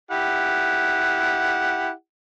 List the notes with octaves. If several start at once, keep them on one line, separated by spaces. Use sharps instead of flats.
E4 G4 F#5